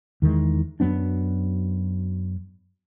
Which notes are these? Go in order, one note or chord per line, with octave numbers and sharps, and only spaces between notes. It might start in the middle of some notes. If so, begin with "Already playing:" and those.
E2 D#3 E3 G#3
F#2 F#3 B3 D4